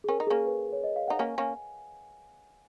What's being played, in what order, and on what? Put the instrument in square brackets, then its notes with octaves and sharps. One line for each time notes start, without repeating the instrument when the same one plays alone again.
[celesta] G#4
[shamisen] C#4 [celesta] A#4
[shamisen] D#4
[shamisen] A#3 C#4 [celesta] G#4
[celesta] B4
C#5
D#5
F5
[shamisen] D#4 [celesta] F#5
[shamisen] A#3 C#4 [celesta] G#5
[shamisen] A#3 C#4